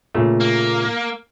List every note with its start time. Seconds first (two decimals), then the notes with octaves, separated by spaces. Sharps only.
0.15 A#2 C#3 A3
0.40 A#3